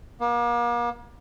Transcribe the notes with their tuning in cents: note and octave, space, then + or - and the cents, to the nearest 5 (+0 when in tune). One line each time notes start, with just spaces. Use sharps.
A#3 +40